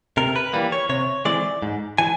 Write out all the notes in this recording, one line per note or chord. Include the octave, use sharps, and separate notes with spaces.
C3 A#4
B4
E3 G3 A#3
C#5
C3 C#5
E3 G#3 C4 D5
G#2
E3 G#5